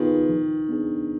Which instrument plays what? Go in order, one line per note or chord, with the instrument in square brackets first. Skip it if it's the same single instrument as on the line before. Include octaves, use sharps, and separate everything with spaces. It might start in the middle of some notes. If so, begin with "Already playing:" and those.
Already playing: [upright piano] D#3 [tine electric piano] B3 F4 G#4 B4
[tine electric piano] F3
B3 D4 G#4